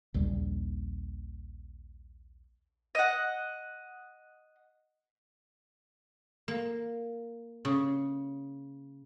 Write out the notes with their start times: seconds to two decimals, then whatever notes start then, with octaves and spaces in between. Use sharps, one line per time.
0.14 A#1 D#2 C#3 G3
2.95 D#5 F#5
6.48 A#3
7.65 C#3